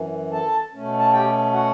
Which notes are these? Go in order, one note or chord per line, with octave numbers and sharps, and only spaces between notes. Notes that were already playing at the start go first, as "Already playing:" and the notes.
Already playing: F#2 E3
A4 A5
B2 A3 C#4
A5
G4 G5
F#4 F#5